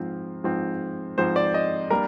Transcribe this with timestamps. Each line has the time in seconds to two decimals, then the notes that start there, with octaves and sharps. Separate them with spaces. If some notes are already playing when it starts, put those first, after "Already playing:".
Already playing: G#2 F3 C4
0.44 G#2 F3 C4
1.18 G#2 F3 C4 C5
1.36 D5
1.54 D#5
1.90 G3 A#3 D4 A#4